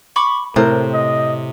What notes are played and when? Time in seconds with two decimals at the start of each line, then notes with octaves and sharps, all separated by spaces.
0.16 B5 C#6 D6
0.56 A2 C3 A#4 C5
0.94 D#5